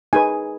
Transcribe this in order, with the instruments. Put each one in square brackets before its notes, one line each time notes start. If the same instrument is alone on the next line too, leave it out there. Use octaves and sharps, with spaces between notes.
[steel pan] D#4 G#4 B4 G#5